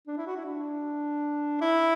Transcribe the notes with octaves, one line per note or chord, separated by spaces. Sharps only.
D4
E4
F#4
E4
D4
E4